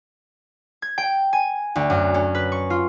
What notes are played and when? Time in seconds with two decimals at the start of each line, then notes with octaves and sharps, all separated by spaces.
0.82 G#6
0.98 G5
1.33 G#5
1.75 D2
1.90 F#2
2.14 C#4
2.35 B4
2.52 C#6
2.70 F4